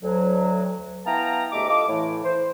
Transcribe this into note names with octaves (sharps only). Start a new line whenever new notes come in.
D2 F#3
B3 E4 F5 G5 A5 A#5
D2 G#3 A3 G4 D6
F4 A4 D#5 D6
A2 E3
C5